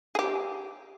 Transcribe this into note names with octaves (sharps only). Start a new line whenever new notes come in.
G4 G#4